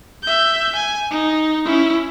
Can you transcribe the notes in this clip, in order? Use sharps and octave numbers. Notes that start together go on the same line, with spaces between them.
E5 G6
G#5
D#4
C#4 E4